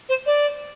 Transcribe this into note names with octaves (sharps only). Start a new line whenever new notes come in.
C5
D5